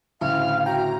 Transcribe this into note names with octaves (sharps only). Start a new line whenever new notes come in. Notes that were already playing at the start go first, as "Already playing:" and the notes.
D2 A2 C#3 E4 F5 F6
F#4 G5 A#5